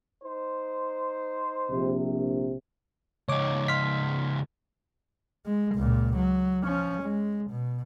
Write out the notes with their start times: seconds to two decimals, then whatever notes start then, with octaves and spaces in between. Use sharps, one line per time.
0.24 D#4 C5
1.71 A#1 C3
3.29 C#2 D#4 C#5 D6
3.68 C6 F6 B6
5.45 G#3
5.75 C#2 A#2
6.16 F#3
6.64 F3 C#4
7.02 G#3
7.50 B2